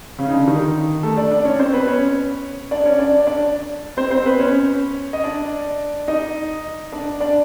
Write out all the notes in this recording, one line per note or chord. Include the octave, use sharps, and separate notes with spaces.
C#3 C#4
D#4
D3 D4
D#3 D#4
A3 A4
D4 D5
D4 D5
C#4 C#5
C4 C5
B3 B4
C#4 C#5
D4 D5
C#4 C#5
D4 D5
D4 D5
C4 C5
C4 C5
B3 B4
C#4 C#5
D#5
D4 D5
D#4 D#5
D4 D5
D4 D5